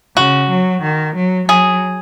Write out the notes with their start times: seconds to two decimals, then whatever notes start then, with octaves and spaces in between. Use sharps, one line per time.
0.17 C#3 F#4
0.50 F#3
0.83 D#3
1.16 F#3
1.49 F#3 G#4